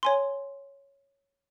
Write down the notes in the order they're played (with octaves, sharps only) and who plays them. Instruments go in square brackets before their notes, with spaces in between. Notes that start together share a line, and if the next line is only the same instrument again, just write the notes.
[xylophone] C#5 G#5 C6